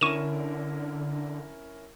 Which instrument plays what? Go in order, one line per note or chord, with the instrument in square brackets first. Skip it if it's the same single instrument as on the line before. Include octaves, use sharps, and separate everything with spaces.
[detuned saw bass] D3 [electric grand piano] C#4 E4 A#4 [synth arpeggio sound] C#6 D#7 E7